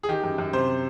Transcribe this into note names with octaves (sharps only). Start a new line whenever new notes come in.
G#4
D#3 G4
F#2
F#2
C3 C5